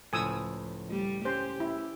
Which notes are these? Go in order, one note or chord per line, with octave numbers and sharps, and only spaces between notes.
C#2 A2 F3 G#5 D#6 E6
G3
C#4 G4 C5 G6
E4